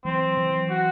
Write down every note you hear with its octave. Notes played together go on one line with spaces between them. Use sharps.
E3 F#3 C4
E3 F#3
F#4